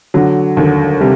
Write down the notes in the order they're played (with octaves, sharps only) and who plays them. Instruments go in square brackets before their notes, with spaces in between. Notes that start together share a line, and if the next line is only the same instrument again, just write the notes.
[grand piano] D3 [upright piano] F#3
[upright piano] D#2 [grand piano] D3
[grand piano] C3 [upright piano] G3